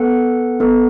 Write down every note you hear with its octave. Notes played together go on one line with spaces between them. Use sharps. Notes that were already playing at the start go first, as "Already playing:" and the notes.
Already playing: B3 A4 F#5
B3 A4